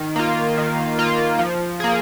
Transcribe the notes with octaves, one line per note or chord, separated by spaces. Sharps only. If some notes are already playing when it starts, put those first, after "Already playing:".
Already playing: D#3
A#3 F4
D#3
A#3 F4
F3
A#3 G#4